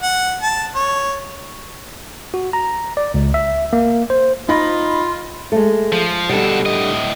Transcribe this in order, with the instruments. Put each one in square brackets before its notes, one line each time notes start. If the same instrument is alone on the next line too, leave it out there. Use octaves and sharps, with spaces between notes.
[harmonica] F#5
A5
C#5
[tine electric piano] F#4
A#5
D5
C#2
E5
A#3
C5
[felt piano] D#4 B5 A#6 [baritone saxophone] F4
[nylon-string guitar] G#3 A3
[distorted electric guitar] F3
[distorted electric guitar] B2 A4 [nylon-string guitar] D3 G3
[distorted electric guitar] A2 D#5